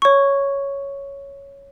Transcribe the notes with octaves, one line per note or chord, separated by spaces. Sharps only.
C#5 C#6